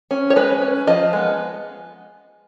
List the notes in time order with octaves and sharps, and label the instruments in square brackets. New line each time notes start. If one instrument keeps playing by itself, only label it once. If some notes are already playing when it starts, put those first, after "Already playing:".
[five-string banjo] C#4
C#5
G#3 B4
C#4
F3 D#5
G#3 B3